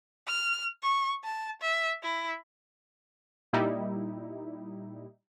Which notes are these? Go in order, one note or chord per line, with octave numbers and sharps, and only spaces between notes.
F6
C#6
A5
E5
E4
A#2 G3 D#4 E4